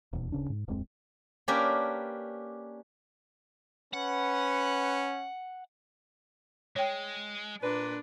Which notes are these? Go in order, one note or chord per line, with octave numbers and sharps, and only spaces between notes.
D#1 E2 B2
D1 C#3 C#4 D4
G#2
D1 F2 G#3 C4
A#3 C#4 D4 G4 A#4 B4
C#4 B4 F#5
G#3 C#5 G5
A#2 D4 B4